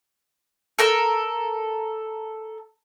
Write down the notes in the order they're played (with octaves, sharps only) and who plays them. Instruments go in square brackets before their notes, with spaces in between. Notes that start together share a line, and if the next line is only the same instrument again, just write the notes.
[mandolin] A4 A#4 E6